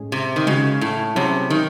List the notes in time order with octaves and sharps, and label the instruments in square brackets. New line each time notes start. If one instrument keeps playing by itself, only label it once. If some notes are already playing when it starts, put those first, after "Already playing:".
Already playing: [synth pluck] A2 G#3 C#4 G#4
[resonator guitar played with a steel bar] C3
D#3
[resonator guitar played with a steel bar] C#3 [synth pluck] G#3 D#4 F#4
[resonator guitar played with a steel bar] A2
[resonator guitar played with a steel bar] C3 [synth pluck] F#3 C#4 E4 G#4 C#5
[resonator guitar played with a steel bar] D#3